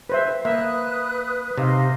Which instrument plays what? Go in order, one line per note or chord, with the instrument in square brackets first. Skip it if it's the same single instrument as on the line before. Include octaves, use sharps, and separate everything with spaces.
[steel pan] B4 C5 E5
[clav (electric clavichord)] A#3 [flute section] B4 D#6 F#6 [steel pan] E5
[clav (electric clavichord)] C3 [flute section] D#4 F5